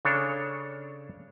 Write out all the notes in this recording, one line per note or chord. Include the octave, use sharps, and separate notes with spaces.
C#3 D4 A4 C#5